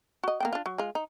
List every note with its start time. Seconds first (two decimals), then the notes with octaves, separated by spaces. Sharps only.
0.24 F#4 D#5
0.40 A#3 B3 G5
0.53 D4 F4
0.66 F#3
0.78 G#3 F4
0.95 D#4